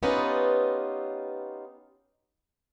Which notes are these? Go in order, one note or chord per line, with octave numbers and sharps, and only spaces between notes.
B3 C#4 D#4 F4 G4 B4